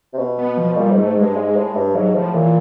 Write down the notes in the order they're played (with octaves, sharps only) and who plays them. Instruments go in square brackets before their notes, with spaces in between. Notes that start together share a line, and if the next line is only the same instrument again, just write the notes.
[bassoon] C3
B2
[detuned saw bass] B3
F3
[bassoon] A#2 [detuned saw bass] G3
[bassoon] G#2
[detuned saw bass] A3
[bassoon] G#2
[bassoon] G2 [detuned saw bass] G#3
[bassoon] G#2
A2
G2
[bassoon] G#2 [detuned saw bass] F#3
[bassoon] A2 [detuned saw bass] F3
[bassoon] A#2 [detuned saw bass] E3